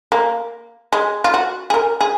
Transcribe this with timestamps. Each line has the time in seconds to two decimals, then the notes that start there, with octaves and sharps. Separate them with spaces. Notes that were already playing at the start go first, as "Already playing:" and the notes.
0.12 A#3
0.93 G#3
1.24 F4
1.34 F#4
1.70 G#4
1.74 A#4
2.01 G#4